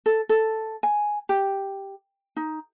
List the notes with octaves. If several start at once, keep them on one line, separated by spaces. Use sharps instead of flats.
A4
A4
G#5
G4
D#4